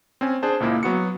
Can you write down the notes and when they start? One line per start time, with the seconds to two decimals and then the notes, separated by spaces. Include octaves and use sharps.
0.21 C4 C#4 G#5
0.42 D4 G#4 C5 A5
0.60 C#2 A#2 A#3 E4
0.83 F#3 B3 F#4 C#7